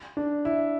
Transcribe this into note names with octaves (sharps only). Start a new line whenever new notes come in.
D4
E4